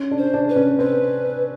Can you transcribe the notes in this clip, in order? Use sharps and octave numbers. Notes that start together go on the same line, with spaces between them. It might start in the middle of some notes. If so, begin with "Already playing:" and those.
Already playing: C#4
D4
C5
D4
B4
C#4
C4 B4